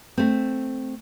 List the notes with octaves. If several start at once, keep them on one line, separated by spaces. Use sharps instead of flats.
A3 C4